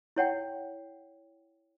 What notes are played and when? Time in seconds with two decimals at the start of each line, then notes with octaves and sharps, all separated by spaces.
0.16 E4 C#5 F#5 G5